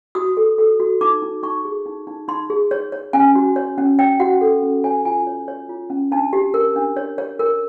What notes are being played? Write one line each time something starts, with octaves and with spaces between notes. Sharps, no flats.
F#4 D#6
A4
A4
F#4
D#4 D6
D#4
D#4 C#6
G#4
D#4
D#4
D#4 C6
G#4
C#5
C#5
C#4 G#5
F#4
C#5
C#4
C#5 G5
F#4 F#5
A4
C#4
C#5 G#5
F4 G#5
C#5
C#5
F4
C#4
D4 A5
G4
A#4
D4
C#5
C#5
A#4